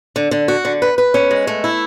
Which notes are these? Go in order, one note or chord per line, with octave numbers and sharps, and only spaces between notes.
D3
D3
F#4
D3
B4
B4
C#4
G#3
A3
E4